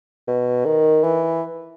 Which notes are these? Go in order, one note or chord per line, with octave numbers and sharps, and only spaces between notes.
B2
D#3
E3